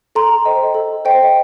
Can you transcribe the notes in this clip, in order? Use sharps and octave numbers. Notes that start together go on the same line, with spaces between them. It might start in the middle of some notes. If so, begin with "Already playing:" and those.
A4 A#5 C6
C5 D#5 G5
A4
C5 D#5 G5